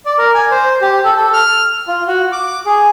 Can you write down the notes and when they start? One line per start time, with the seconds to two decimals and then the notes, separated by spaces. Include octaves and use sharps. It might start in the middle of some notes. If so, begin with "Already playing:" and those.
0.06 D5
0.18 A#4
0.34 G#5
0.51 C5
0.82 G4
1.04 A4
1.17 A4
1.33 F6
1.88 F4
2.08 F#4
2.32 D6
2.66 G#4